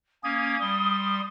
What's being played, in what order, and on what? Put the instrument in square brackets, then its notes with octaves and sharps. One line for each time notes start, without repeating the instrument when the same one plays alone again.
[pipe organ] A#3 C#4 G#6 [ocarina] D#6
[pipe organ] G3 C6